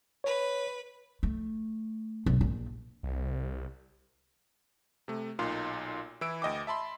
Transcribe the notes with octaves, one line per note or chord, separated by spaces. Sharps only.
B4 C#5
A3
B1
A#1
C2
C3 A3
B1 A#2 D#4 F4 F5 C6
E3 E4 E6 D7
D2 D#5 G5 D6
E5 A5 B5 C6